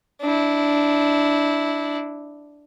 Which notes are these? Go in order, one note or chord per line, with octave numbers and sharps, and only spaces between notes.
D4 E4